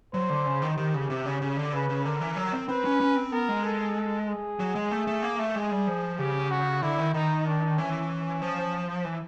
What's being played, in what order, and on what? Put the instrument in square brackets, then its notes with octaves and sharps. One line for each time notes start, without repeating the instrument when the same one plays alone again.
[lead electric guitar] F#3 [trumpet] C5
[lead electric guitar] D3
C#3
D#3
[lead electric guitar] D#3 [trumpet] G4
[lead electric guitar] C#3
C3
C#3
C#3
D3
[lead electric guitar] C#3 [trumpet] B4
[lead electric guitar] C#3
[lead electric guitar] D3 [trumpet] A#4
[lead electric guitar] E3
F#3
C4
[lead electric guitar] C4 [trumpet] B4
[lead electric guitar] C#4
C#4
C4
[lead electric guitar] B3 [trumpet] A#4
[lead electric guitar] G#3
[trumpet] A4
G#4
[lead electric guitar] F#3
G#3
A3
A3
A#3
A3
[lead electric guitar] G#3 [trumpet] G#4
[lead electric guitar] G3
F3
[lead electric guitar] C#3 [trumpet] G4
[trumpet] F#4
[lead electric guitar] D3 [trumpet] E4
[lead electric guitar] D#3
[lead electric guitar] D#3 [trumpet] D#4
[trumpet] D4
[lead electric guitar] E3 [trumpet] C#4
[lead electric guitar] F3
E3